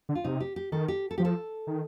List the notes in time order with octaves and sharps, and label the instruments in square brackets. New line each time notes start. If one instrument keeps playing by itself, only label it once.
[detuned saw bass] D3
[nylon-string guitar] F4
[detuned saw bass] C3 [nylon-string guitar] D#4
[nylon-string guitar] G4
G4
[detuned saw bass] D#3 [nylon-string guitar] A4
[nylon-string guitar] G4
A4
[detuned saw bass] F3 [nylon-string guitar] G4
[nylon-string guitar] A4
[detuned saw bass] D#3